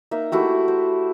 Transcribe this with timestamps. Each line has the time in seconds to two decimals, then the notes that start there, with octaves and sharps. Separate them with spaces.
0.11 A#3 D#4 E5
0.32 A3 E4 F#4 G4
0.68 C5